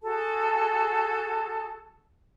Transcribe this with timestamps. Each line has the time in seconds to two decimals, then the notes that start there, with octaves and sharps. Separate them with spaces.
0.02 F#4 G#4 A4 A5